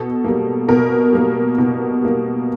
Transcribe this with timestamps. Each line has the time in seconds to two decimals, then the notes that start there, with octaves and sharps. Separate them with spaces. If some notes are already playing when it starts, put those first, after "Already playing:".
Already playing: B2 A4
0.24 G3 A#3
0.68 B2 A#4
1.13 G3 A#3
1.58 B2
2.02 G3 A#3